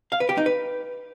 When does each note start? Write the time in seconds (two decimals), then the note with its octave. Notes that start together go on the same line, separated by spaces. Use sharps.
0.12 F5
0.20 B4
0.29 G4
0.37 D#4
0.46 B4